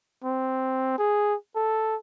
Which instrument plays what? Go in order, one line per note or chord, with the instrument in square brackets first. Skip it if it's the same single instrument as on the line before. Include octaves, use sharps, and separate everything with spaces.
[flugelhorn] C4
G#4
A4